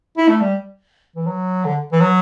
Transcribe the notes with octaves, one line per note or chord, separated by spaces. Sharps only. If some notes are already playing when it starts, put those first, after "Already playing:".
E4
A3
G3
E3
F#3
D3
E3
F#3